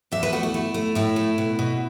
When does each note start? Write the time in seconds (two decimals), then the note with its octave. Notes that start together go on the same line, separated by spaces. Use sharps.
0.12 E2 E5
0.23 B4
0.32 A3 F#4
0.43 E4
0.54 A3
0.74 A3
0.95 A2 E4
1.16 A3
1.38 B2
1.59 B2